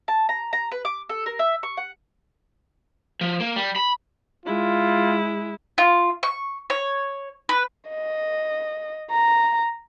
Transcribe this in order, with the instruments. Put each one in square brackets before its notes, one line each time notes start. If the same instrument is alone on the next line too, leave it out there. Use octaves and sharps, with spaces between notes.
[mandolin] A5
A#5
A#5
B4
D6
A4
A#4
E5
C#6
F#5
[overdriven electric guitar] F3
A#3
G3
B5
[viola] G#3 E4 [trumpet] F4
[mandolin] F4
C#6
C#5
B4
[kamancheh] D#5
A#5